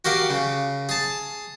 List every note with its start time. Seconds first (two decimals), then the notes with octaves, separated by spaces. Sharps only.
0.05 F#4 G4 A#4 F5
0.30 C#3
0.89 G#4 A5